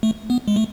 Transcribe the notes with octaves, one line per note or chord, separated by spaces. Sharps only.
A3
B3
G#3
A3